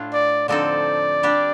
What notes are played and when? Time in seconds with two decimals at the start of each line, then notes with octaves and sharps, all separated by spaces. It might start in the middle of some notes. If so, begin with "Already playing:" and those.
Already playing: A2 A3 D4 F4
0.13 D5
0.48 D3 F3 C4 D#4 A4 D5
1.23 G3 D4 G4